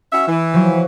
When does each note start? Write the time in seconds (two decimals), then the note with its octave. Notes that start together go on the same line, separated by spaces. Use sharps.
0.11 C#4 F#4 E5
0.28 E3
0.54 F3 F#3